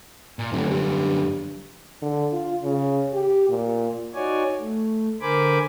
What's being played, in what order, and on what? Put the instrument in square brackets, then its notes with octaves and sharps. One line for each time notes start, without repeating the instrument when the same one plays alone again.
[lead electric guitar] A#2
[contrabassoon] F1 [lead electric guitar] F#2 D3
[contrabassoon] G2
[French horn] D3
F4
C#3
G4
A#2
[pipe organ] D#4 F#4 C#5 D5 G#5
A3
D3 A#4 C5 G#5 B5 D6